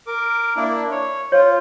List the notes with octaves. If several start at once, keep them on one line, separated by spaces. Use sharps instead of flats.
A#4 D6
A#3 D4 E4
C#5
F4 C#5